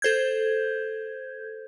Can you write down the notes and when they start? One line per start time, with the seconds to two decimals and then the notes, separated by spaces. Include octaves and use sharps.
0.02 A4 C5 G6 G#6